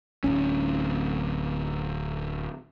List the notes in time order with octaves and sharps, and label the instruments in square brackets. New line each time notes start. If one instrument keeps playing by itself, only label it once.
[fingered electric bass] D1 G#1 C#4